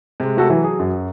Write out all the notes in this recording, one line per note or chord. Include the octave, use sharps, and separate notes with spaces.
C3 G#3
A3 F#4 A4
E3 F#3
G#4
F#2